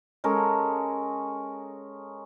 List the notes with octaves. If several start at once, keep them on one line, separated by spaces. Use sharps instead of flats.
G#3 C#4 A4 A#4